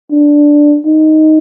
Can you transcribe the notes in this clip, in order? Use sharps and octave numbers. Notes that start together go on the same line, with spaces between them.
D4
D#4